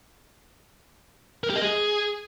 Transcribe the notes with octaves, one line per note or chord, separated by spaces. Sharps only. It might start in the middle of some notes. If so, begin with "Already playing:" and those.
A#4
G4
D#5
G#4